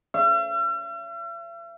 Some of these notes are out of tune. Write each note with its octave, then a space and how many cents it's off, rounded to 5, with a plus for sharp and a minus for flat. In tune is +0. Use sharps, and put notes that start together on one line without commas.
E5 +45